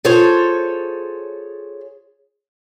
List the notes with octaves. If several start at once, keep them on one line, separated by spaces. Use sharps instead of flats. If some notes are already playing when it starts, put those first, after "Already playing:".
F4 G#4 A4 C5 C#5